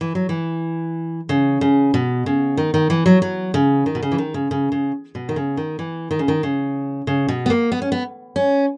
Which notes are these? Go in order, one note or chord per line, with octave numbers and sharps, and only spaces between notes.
E3
F#3
E3
C#3
C#3
B2
C#3
D#3
D#3
E3
F#3
F#3
C#3
D#3
B2
C#3
E3
D#3
C#3
C#3
C#3
B2
D#3
C#3
D#3
E3
D#3
C#3
D#3
C#3
C#3
B2
B3
A#3
B3
C#4
B3
C#4